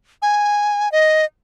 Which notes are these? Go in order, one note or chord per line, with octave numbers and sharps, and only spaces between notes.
G#5
D#5